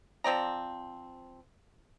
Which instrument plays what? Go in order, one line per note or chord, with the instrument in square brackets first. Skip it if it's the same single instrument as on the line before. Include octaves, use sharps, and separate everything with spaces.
[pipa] F3 C4 D5 A#5